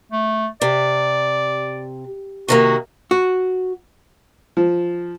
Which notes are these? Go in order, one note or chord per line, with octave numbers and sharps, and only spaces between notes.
A3
C3 D5
C3 D#3 A#3 F#4
F#4
F3